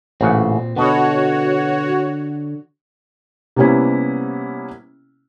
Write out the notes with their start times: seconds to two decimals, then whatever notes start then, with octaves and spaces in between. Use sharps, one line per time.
0.21 A1 A#2 C#3 C4 F#5
0.76 B2 D3 B3 F#4 C#5
3.56 C3 G3 A#3 B3 C#4 E4